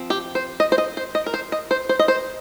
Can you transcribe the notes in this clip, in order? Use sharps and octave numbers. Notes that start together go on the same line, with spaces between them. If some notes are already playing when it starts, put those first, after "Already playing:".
Already playing: F3 C4
G4
C5
D#5
C5
D#5
C5
D#5
A#4
C5
D#5
C5
C5
D#5
C5